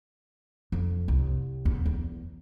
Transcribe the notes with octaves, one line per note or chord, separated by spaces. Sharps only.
F2
C2
E2
E2